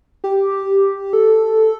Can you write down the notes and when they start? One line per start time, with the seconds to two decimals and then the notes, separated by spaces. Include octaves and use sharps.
0.24 G4
1.13 A4